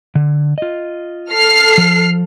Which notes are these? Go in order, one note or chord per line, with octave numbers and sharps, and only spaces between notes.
D3
F4 D#5
A4 F6 C7
F3